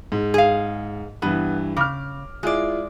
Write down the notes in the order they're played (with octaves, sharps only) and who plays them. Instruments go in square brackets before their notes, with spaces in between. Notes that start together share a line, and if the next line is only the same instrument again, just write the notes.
[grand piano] G#2
[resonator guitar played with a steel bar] G#4 F5
[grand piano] G2 E3 [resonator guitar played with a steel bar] B3
[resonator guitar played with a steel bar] C#3 [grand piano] D6 F6
[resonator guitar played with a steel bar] G#3 D5 [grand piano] E4 F4 G#4